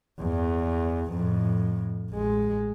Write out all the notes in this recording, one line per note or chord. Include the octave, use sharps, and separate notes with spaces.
E2
F2 A2
A1 G#3